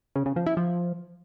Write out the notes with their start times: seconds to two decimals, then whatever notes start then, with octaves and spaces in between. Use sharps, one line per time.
0.16 C#3
0.26 C#3
0.36 F3
0.46 E4
0.57 F3